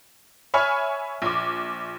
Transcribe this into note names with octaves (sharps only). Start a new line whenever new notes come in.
C#5 E5 G#5 B5 C#6 F6
A#1 D6